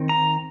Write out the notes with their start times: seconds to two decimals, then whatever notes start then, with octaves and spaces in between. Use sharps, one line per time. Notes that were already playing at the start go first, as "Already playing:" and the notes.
Already playing: D#3 C4
0.09 A#5